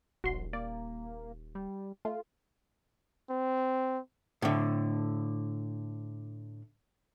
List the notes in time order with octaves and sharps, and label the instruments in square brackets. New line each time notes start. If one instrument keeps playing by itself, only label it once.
[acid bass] D#1 [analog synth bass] A#1 [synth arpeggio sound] F#4 C6
[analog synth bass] A#3 [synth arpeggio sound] D5
[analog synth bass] G3
[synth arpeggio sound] A3 [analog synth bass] F4
[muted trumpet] C4
[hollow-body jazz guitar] A2 D3